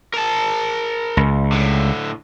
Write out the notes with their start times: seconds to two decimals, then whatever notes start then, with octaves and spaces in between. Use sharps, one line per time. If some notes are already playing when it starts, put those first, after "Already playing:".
0.14 A#4 A5
1.17 C#2
1.52 A2 D3